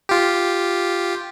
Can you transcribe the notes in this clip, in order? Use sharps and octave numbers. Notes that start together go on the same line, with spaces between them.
F4 G4